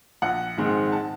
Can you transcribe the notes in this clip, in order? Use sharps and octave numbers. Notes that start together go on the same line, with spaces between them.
A#1 F#5
G#2 D#3 G#3 C4
A5